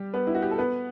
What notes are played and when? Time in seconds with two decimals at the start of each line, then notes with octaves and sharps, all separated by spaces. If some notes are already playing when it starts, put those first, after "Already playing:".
Already playing: G3 G4
0.14 B3 B4
0.27 E4
0.35 F#4
0.42 G4
0.51 A4
0.58 B3 B4